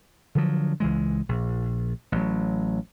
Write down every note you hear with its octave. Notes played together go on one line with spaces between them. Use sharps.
D3 F3 F#3
C#2 E3 G#3
A#1
A1 F#3